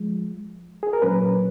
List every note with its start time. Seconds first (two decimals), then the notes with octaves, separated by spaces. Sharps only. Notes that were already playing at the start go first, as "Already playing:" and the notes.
Already playing: F3 G#3
0.83 G#4
0.93 A#4
1.02 A#2 F#3 C#4 B4